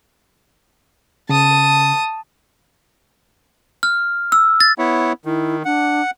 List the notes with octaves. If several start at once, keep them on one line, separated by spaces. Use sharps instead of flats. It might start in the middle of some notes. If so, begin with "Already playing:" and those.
C#3 A5 D#6
F6
E6
A6
B3 E4 C#5
D#3 E4
D4 F#5